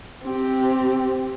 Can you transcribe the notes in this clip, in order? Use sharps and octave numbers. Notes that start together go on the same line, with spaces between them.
C4 G4